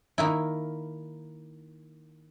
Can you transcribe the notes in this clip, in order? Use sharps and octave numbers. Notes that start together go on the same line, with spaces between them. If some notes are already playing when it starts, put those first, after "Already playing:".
D#3 A#3 E4